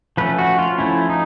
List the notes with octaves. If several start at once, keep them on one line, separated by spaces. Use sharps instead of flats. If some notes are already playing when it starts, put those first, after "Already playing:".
F3 A3 C#4 B4
F#4
F4
F3 A3 C#4 E4
D#4